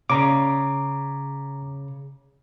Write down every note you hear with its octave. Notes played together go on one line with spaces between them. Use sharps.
C#3 A#5 D6